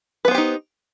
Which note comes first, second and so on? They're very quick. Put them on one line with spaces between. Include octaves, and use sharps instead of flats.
B4 B3 C5 G4 D#4